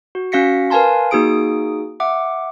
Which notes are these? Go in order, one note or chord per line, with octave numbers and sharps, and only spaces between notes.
F#4
C#4 F#4 F5 A#6 B6 C#7
A#4 B4 F5 G#5 A5 C6
A#3 D#4 F#4 G#4 D#6 D7
E5 F#5 D6